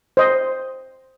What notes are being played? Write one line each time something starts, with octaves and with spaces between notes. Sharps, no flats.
C5 D#5